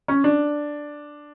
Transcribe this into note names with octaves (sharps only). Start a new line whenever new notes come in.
C#4
D4